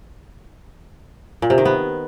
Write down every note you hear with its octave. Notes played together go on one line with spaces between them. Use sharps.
A#2
C3
D#3
B3